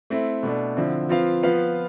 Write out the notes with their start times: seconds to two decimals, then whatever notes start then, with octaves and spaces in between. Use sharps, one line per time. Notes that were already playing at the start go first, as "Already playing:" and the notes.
0.10 A3 C4 E4
0.43 B2 A3 D4
0.77 D3 F3 C4 E4
1.09 F3 C4 F4 B4 F5
1.43 F3 B3 F4 B4 F5